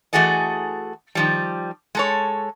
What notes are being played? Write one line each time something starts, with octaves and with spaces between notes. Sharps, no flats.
E3 A3 F#4 G#4 A4 D#5
D#3 F3 G3
G#3 A4 C#5